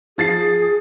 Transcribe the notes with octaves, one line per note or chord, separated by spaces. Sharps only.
F3 G#4 A6 C7